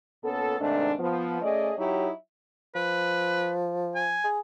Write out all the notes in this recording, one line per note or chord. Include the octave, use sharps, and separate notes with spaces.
A#2 B3 C#4 A4
G#2 C3 D#3 A3 D4
F3 B3
A3 C#4 G#4 D5 D#5
F#3 D#4 E4 G4 C#5
F3 B4
G#5
G#4